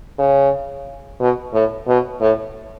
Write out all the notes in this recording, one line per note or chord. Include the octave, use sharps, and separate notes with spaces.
C#3
B2
A2
B2
A2